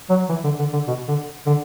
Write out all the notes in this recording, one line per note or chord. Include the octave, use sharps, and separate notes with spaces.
F#3
E3
D3
D3
D3
B2
D3
D3